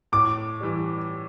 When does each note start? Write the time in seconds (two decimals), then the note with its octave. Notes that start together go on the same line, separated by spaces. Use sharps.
0.12 A2 D6
0.60 E3 G3